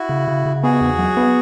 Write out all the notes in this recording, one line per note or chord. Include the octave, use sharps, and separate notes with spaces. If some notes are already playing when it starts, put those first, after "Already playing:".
Already playing: E4 F#4
C#3
C#3
C#3
B3 F#4 G#4
E2
F#3
B3